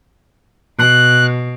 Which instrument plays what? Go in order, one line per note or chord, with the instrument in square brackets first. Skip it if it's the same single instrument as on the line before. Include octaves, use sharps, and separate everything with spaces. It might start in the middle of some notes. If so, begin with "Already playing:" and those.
[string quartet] B2 [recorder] F#6